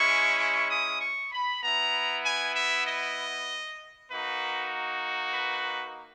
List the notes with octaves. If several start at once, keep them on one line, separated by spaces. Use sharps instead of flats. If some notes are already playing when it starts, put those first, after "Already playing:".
Already playing: G#3 C#4 E4 C#6
C#6
D#6
C#6
B5
B3 E4 A#5
G#5
E5
D#5
A#3 D#4 F#4 B4
B4